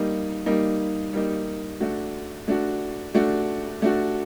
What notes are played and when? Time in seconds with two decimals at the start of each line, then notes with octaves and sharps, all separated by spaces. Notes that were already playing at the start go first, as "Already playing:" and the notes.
Already playing: G3 A#3 D#4
0.46 G3 A#3 D#4
1.13 G3 A#3 D#4
1.80 A3 D4 F#4
2.48 A3 D4 F#4
3.15 A3 D4 F#4
3.82 A3 D4 F#4